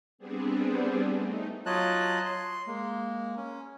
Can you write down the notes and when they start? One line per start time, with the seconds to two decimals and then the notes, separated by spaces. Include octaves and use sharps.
0.18 G3 B3 C4 D4 G#4
1.12 A3 D#4
1.66 F#3 F4 C#5 D#5 A5 F#6
2.26 C6
2.67 G#3 A#3
3.37 C#4